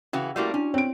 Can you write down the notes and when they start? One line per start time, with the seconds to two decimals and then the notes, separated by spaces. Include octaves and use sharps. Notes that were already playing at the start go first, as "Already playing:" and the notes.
0.13 C#3 E3 C#4 F#4
0.36 G3 A3 A#3 E4 F#4 F#5
0.54 C#4 D4
0.74 C4 C#5 D7